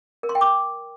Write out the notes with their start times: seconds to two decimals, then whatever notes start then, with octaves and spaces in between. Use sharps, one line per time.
0.23 A#4
0.29 C6
0.35 G5
0.41 D6